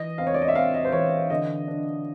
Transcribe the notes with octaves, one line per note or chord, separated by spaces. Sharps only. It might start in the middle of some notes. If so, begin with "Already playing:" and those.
Already playing: E3 D#5
C4 F5
C#5
D5
D#5
E5
C4 F5
D#5
C5
E3 C#5
D3 D#5
D4